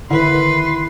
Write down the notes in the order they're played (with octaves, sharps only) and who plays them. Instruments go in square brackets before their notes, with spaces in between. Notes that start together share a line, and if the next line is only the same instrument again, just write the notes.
[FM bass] D3 [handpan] D#3 E4 [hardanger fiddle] B4 [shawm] C6